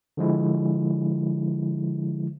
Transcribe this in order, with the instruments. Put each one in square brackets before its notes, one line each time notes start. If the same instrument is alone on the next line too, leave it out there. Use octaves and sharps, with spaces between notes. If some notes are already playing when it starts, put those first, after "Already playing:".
[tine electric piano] D3 F3 G#3 E4